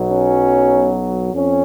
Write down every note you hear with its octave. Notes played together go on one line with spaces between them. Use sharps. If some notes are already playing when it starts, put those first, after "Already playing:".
Already playing: B1 B2 F#3
C#4
F2 C#4